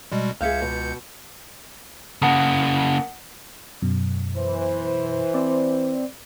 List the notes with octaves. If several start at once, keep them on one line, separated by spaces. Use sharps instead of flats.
B2 G3 G#3
C#2 G#4 E5 F5 G6 C#7
B2
C#3 A#3 F#5 A5 D#6
F#2 B2
E3 C5
C4 D5